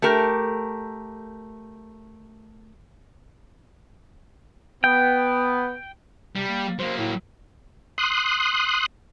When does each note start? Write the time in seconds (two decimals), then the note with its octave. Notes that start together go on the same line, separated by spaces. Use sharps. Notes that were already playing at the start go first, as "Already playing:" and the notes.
0.02 A3 G4 A#4
4.84 B3 G5
6.36 C3 G3
6.48 A#3
6.79 F#3 A#3 C5
6.98 A2
7.98 C6 D#6 F#6